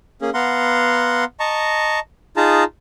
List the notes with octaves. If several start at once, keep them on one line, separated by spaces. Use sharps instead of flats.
A#3 C#4 G#4
B3 F5 F#5 A#5 C6
D#5 A5 A#5 C#6
D#4 F4 G#4 A5 A#5